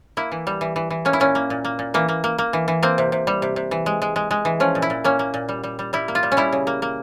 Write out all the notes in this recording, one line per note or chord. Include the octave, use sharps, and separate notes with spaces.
A#3 E4
E3
G3
E3
E3
E3
A#3 C#4
E4
A#2 C#4
A#3
A#2
A#3
A#2
E3 A#3
A#3
A#3
A#3
E3
E3
A#3 C4
C3
C3
G3
C3
C3
E3
G#3
G#3
G#3
G#3
E3
F3 C#4
A#2
E4
A#2
A#3 C#4
A#3
A#2
G3
G3
G3
G3 E4
A#3
F4
G3
C#4
G3 E4
C#3
A#3
A#3